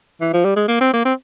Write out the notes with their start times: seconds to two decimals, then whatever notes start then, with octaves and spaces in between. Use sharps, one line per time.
0.21 E3
0.33 F3
0.45 G3
0.56 G#3
0.68 A#3
0.81 C4
0.93 A#3
1.05 C4